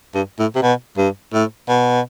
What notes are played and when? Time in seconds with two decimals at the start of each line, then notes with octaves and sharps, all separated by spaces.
0.14 G2
0.39 A2
0.55 C3
0.62 B2
0.97 G2
1.33 A2
1.68 B2